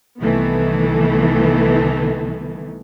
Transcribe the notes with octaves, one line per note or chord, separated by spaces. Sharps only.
C2 D#3 E3 A3 B3